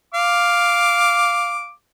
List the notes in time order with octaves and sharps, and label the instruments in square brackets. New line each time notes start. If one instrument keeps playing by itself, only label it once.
[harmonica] F5 D6